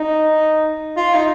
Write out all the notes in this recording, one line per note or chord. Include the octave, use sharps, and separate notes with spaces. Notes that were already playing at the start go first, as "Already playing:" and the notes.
Already playing: D#4
F4
D#4